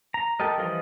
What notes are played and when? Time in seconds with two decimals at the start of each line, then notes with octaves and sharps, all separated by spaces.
0.14 A#5
0.40 G4 A4 A#4 D#5
0.58 E3 F3 G3 F4 D#5